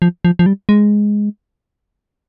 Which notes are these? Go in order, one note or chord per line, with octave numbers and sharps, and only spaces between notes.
F3
F3
F3
G3
G#3